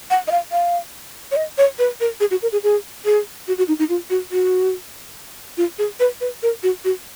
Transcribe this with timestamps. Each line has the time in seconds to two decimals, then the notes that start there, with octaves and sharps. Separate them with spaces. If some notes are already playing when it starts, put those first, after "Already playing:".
0.11 F#5
0.28 D#5
0.31 F5
0.52 F5
1.32 C#5
1.36 D#5
1.58 C#5
1.79 B4
2.00 A#4
2.20 G#4
2.31 F#4
2.42 A#4
2.52 G#4
2.63 G#4
3.05 G#4
3.48 F#4
3.58 F#4
3.68 D#4
3.79 D#4
3.89 F4
4.10 F#4
4.32 F#4
5.57 F4
5.79 G#4
6.00 B4
6.21 B4
6.43 A#4
6.63 F#4
6.85 F#4